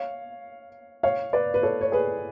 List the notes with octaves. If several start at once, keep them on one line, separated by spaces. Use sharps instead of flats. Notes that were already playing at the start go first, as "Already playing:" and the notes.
Already playing: C#5 F5
C#5 F5
B4 D5
B4
A4 C#5
C#5
G#4 B4